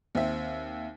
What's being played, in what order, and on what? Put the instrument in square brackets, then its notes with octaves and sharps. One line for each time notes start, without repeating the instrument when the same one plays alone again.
[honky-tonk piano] D#2 C4 E5